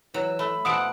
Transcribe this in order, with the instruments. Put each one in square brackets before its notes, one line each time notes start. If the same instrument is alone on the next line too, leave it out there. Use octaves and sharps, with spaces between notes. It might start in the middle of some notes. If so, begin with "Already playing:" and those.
[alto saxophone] E3 [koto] F#3
[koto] A3 [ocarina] B5
[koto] B2 F3 E4 [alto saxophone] F#5 [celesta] D#6 D7